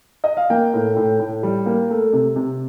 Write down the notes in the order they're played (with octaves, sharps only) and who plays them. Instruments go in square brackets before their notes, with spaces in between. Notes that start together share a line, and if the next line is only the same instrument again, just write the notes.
[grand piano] D#5
F5
A#3 G5
A2
A2
A2
G3
A#3
A3
C3
C3